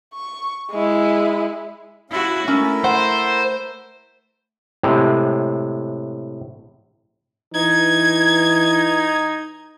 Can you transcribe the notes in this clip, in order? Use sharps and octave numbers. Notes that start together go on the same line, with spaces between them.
C#6
G#3 E4
C#4 E4 F#4 F5
A3 C#4 E4 A#4 E5
C5 F#5
A2 C3 G#3
E3 D#4 G#6